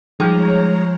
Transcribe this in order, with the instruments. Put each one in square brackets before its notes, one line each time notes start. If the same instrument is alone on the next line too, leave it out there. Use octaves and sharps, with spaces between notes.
[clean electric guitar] F3 [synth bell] G3 D#4 G#4 [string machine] G#3 C#5 A#5